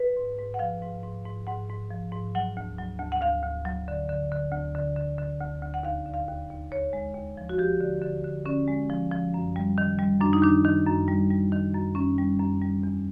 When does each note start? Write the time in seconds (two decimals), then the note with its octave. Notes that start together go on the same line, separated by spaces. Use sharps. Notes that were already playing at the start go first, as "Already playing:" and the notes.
Already playing: B4
0.17 G#2
0.38 G#2
0.54 F#5
0.59 F3 F5
0.82 G#2
1.04 G#2
1.25 G#2
1.47 G#2 F#5
1.69 G#2
1.90 F3
2.12 G#2
2.35 F#3 F#5
2.57 D2
2.78 F#3
2.99 D2
3.12 F#5
3.21 D2 F5
3.43 D2
3.65 F#3
3.88 D3
4.09 D3
4.32 D3
4.53 D2
4.75 D3
4.96 D3
5.18 D3
5.41 D2
5.62 D2
5.74 F#5
5.83 D#2 F5
6.06 D3
6.14 F5
6.28 D#2
6.50 D#2
6.71 D#2 C#5
6.93 G#3
7.15 D#2
7.37 F3
7.49 F#4
7.58 F3 G4
7.80 D3
8.02 D3
8.25 D3
8.45 D3 C#4
8.68 G#3
8.90 F3
9.12 F3
9.34 F#2
9.56 G3
9.78 D#3
9.99 G3
10.21 F#2 D4
10.33 D#4
10.42 D#3 D4
10.65 D#3
10.86 F#2
11.08 G3
11.31 G3
11.52 D#3
11.74 F#2
11.95 F#2 C#4
12.18 G3
12.39 F#2
12.62 G3
12.83 E2